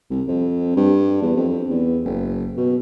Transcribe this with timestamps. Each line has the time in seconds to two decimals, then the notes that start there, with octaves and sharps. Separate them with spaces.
0.10 C2
0.28 F2
0.76 G2
1.22 E2
1.36 F2
1.70 E2
2.05 F#1
2.57 B2